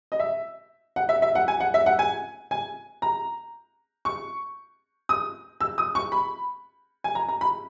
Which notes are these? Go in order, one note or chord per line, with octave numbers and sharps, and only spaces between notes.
D#5
E5
F#5
E5
E5
F#5
G#5
F#5
E5
F#5
G#5
G#5
A#5
C#6
D#6
E6
D#6
C#6
B5
G#5
A#5
A#5
B5